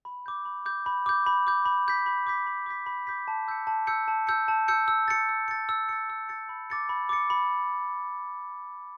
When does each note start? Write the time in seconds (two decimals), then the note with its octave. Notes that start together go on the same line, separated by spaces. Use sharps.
0.05 B5
0.26 D6 G6
0.45 B5
0.66 D6 G6
0.86 B5
1.06 D6 G6
1.26 B5
1.47 D6 G6
1.66 B5
1.87 D6 G6 B6
2.06 B5
2.26 D6 G6 B6
2.46 B5
2.66 D6 G6 B6
2.86 B5
3.07 D6 G6 B6
3.28 A5
3.48 E6 G6 C#7
3.67 A5
3.87 E6 G6 C#7
4.08 A5
4.27 E6 G6 C#7
4.48 A5
4.68 E6 G6 C#7
4.88 E6
5.08 A6 C#7
5.29 E6
5.48 A6 C#7
5.69 E6
5.89 A6 C#7
6.10 E6
6.29 A6 C#7
6.49 B5
6.70 D6 A6 C#7
6.89 B5
7.09 D6 A6 C#7
7.30 B5